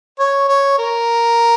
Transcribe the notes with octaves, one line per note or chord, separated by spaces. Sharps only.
C#5
C#5
A#4